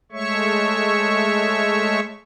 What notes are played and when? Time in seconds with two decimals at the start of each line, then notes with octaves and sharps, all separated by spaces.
0.12 G#3 A3 C#5 E5 C#6